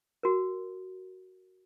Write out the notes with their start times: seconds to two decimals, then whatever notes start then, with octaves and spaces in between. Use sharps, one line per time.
0.23 F#4 A#4